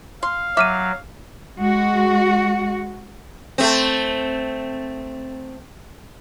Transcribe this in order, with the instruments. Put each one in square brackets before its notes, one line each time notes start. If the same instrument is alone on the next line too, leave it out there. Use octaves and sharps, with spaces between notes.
[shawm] F5 [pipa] C6
[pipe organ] F#3 [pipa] E5 [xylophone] D6 F6 D#7
[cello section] G#3 F#4
[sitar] A3 C4